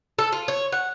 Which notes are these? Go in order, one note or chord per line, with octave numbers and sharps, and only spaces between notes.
A4
F4
C#5
F#5